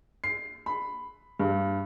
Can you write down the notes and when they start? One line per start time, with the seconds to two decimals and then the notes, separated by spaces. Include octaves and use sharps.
0.24 C7
0.66 B5
1.40 G2